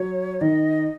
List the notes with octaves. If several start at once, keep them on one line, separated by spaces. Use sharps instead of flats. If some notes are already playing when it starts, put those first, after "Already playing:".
Already playing: F#3 C#5
D#3 D#5